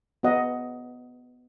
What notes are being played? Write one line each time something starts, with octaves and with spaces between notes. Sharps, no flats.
B3 F#4 D#5 F#5